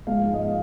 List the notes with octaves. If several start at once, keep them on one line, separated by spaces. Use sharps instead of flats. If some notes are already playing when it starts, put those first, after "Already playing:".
G#2 F3 G#3 F5
D#5
F3 F5